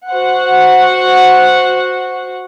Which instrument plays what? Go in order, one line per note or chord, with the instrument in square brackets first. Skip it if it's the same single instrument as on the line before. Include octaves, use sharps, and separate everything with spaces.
[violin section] F#4 C5 F#5